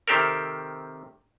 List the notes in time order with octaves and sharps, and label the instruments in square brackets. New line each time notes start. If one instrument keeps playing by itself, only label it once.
[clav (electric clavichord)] C3 D#3 C4 G4 A4 A#4